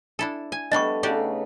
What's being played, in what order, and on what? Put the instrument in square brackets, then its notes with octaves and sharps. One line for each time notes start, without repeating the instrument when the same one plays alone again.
[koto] D4 E4 A4
G#5
[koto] G3 A3 D4 [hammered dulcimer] B3 A4 B4 [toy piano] D#5 C#6
[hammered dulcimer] C#3 A3 D#4 [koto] F#4 G4 D5